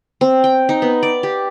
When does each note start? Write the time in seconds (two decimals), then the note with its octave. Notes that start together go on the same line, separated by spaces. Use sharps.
0.21 C4
0.44 G5
0.69 D#4
0.82 B3
1.03 D5
1.23 G4